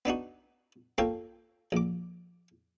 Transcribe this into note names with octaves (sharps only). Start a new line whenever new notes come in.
B3 D4 D#4 F#4
A#3 F4 A4 C#5 G5
A#1 D6